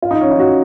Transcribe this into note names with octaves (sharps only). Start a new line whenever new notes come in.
F4
D#4
C#4
D#4
F#4